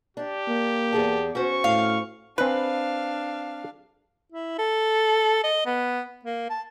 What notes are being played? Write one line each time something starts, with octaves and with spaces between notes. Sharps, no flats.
D4 G4
A#3
E2 G#4 A5
C#4 F#4 C5 C#6
A2 F5
C4 D4 B4 F5 G#5
E4
A4
D#5
B3
A#3
A5